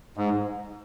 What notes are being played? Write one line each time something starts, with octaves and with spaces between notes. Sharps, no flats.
G#2